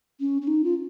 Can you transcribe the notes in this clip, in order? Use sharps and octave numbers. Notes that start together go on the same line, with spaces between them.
C#4
C#4
D#4
F4